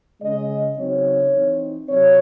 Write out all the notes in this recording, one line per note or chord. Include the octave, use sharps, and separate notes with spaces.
C#3 G#3 C#4 D#5
C#3 F#3 C4 D#4 C#5
E3 C4 D#4
C3 F#3 C4 C#5